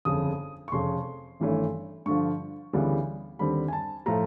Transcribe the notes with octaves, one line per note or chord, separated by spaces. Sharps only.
G1 F2 C#3 D#6
C#6
F1 F2 C#3 C6
G#1 G2 E3 A3 C#4
G2 D3 F3 C#6
D2 C#3 E3 G3 B3
D#2 D3 G3 C4 B5
G#5
A5
A2 F3 A3 A#5